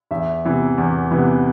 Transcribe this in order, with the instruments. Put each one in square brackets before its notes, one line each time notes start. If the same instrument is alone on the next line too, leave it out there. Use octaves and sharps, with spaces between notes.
[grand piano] E2 E5
C3 E3 B3
E2
C3 E3 B3